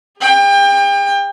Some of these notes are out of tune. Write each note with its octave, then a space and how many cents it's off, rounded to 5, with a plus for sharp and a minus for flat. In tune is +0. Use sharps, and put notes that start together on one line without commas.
G#4 -45 G5 +30